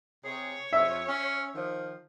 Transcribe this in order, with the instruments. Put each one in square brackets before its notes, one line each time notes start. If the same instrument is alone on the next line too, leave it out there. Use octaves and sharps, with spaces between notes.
[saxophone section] C3 G#4 [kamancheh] C#5
[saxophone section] F2 [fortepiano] E5
[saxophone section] C#4
D#3 F3